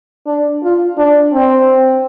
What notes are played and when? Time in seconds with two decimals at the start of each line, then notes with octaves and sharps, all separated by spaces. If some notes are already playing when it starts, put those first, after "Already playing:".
0.26 D4
0.63 F4
0.98 D4
1.33 C4